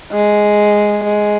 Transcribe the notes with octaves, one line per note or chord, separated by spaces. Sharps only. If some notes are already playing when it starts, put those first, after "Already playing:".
G#3
G#3